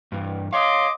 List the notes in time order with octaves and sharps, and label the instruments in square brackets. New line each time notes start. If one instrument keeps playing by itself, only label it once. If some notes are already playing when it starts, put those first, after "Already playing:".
[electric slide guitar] G2 E3
[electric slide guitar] C#5 F5 [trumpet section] D#5 C6 D6